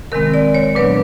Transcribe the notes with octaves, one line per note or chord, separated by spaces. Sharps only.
C3 D#3 G#3 C4 A#4
D5
C#5
A#2 F#3 B3 D4 B4